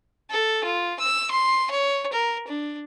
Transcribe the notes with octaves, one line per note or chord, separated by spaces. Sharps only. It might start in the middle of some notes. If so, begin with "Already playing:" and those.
A4
F4
E6
C6
C#5
A#4
D4